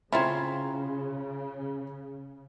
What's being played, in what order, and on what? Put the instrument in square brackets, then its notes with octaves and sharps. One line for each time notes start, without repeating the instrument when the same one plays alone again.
[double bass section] C#3 [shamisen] C4 E4 [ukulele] C#4 F4 [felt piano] A#5 B5 G#6